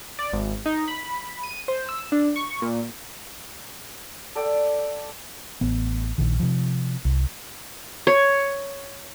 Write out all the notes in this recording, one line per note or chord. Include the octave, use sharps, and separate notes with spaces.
D5
G#1
D#4
B5
D#7
C5
E6
D4
C#6
A#2
A4 D5 G5
A1 B3
A#1 D#3
C3 F3
C2
C#5